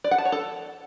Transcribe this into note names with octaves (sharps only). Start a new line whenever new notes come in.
D5
F#5
A5
C#5
A4